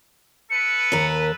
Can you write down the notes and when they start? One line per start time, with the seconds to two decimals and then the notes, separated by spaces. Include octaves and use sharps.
0.50 A4 B4 C#7
0.92 D#2 A#4